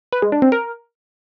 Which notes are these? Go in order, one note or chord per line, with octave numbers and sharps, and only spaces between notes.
B4
G#3
D4
C4
A#4